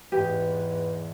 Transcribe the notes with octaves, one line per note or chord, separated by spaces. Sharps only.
E2 G#2 G4 B4